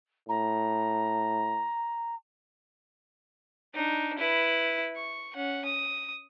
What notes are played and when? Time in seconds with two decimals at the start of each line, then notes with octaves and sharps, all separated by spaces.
0.29 A2 A#5
3.74 D4 D#4
4.18 E4 B4
4.96 C#6
5.35 C#4 F#5
5.65 D#6